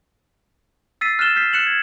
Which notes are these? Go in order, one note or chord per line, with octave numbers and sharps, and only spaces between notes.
E6 A6 B6 C7 D#7
F6 F#6 A6 E7 G7
F6 G6 B6 C7
F#6 C#7 E7 F#7
G#6